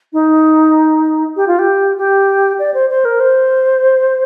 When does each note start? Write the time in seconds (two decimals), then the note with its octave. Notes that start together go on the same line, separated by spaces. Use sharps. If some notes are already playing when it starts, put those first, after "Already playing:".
0.13 D#4
1.36 G4
1.47 F4
1.59 G4
1.98 G4
2.59 D5
2.74 C5
2.90 C5
3.05 A#4
3.20 C5